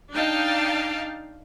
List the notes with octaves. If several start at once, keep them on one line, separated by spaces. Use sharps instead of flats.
D4 D#4 F5 G5 A5